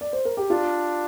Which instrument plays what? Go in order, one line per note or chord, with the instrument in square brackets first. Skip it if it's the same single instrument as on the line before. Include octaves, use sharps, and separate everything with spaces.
[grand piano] D5
C5
A#4
G4
[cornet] D4 [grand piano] F4